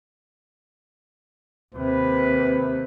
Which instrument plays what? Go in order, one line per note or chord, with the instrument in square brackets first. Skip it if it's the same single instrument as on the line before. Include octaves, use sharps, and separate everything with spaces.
[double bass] D#2 C3 [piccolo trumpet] B4